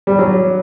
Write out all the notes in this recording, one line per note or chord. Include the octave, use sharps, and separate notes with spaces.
G3
F#3